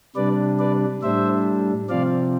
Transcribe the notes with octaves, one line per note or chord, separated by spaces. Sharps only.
C3 G3 D4 B4 D5
B4 D5
A2 G3 D4 C5 E5
C3 F3 C4 D5 F5